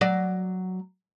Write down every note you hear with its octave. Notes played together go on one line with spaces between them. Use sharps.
F#3 D5